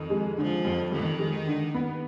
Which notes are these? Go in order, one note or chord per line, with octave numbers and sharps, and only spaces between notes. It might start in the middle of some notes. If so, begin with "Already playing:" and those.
Already playing: F2 D#3
G#3
D3 F3
F2
F2 D#3
G#3
D3
B3